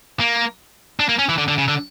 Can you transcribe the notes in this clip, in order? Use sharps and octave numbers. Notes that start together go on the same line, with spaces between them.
A#3
D4
A#3
C#4
E3
D3
D3
C#3
D3